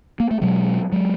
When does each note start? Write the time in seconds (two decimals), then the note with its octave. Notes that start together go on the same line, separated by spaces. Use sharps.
0.20 A#3
0.31 A3
0.41 B2 F#3 G#3
0.92 F#3 G#3